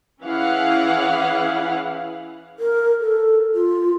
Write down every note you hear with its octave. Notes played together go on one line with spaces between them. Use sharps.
E3 C#4 E4 G#4 F5 F#5
A#4
A4
F4